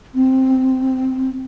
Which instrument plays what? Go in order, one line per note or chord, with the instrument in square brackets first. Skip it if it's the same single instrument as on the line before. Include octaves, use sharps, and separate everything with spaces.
[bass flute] C4